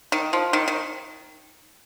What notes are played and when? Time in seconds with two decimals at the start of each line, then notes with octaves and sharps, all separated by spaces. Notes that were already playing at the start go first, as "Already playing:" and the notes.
0.12 D#3
0.33 F3
0.53 D#3
0.68 D#3